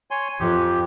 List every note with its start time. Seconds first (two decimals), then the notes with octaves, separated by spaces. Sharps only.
0.11 C#5 G#5 C6
0.40 F2 G4